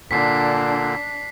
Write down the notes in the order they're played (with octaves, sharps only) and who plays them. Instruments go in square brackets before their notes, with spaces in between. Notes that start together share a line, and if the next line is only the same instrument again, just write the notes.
[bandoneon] A#2 D3 [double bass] D4 [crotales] B6 C7